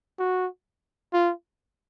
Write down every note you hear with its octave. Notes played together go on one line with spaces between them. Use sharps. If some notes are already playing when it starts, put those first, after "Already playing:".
F#4
F4